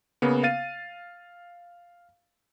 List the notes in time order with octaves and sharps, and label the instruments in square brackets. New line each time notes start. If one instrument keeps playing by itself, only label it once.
[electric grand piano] C#3 A#3 B3
F5 A6 D#7